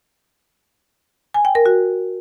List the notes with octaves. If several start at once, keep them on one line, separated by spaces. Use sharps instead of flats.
G#5
G5
A#4
F#4